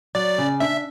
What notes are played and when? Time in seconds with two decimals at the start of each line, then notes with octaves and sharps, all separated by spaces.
0.15 F#3 D5
0.38 C#3
0.60 D4 E5